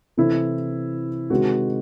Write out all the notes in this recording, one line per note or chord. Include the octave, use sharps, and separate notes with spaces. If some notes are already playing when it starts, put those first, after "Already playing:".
C3 E3 A3 E4
C3 D#3 G#3 F#4